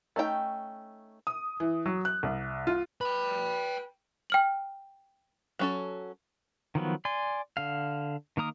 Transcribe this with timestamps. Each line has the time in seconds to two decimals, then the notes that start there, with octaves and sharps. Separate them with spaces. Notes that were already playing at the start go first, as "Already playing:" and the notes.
0.16 A3 C#4 D#4 G#4 G5
1.27 D#6
1.60 E3
1.86 F#3
2.05 F#6
2.23 C2
2.67 F4
3.01 B4 G5 B5
4.30 G5 F6 F#7
5.59 F#3 C#4 A4
6.75 D#3 F3 F#3 B3
7.05 D5 G#5 C6
7.57 D3 F5
8.37 D#3 A#3 A#4 D#6